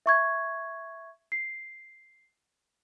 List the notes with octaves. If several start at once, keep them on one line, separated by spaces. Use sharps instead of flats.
E5 C#6 G#6
C7